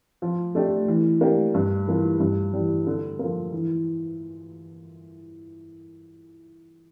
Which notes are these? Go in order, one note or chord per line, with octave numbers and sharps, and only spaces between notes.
F3
A3 D4 G4
E3
A#3 D4 G4
G2
E3 A#3 F4
G2
E3 G3
D3
F3 A#3
E3